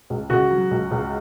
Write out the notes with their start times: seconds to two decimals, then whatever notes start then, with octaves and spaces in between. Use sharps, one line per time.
0.10 C#2
0.30 C#3 F#4
0.51 F#3
0.71 C#2
0.91 C#2